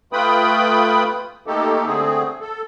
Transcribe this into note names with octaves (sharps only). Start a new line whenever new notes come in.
A3 F4 B4 G5 B5 D#6
A3 A#3 D#4 G4 A4
D3 A3 C4 G#4
A4